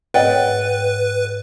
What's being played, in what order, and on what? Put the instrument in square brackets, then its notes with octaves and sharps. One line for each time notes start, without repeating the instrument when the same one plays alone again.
[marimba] G#2 C#5 A6 [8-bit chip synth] B4 [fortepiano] D#5 F#5 G5